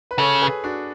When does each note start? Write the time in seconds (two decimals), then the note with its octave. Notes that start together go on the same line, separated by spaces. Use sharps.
0.11 B4
0.19 C#3 A4 C#5
0.41 G#4 B4
0.64 D4 F#4